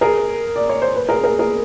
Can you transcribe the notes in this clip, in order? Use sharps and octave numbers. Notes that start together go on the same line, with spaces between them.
G#4 A#4
D5
C#5
C5
B4
G#4 A#4
G#4 A#4
G#4 A#4